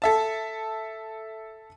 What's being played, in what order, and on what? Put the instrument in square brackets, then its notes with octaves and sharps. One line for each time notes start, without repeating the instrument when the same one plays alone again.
[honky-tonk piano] A4 E5 A5